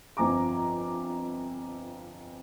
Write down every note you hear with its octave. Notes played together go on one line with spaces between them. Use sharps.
G1 F2 F3 G#5 A#5 D6